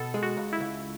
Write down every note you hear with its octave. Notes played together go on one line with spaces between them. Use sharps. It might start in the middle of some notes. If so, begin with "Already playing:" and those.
Already playing: B2 A4
G#3
F#4
C#2
E4
C#2